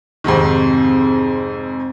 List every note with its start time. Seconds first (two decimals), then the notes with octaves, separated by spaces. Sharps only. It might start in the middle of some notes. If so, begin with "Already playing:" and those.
0.24 F2 G#2 C3 D#3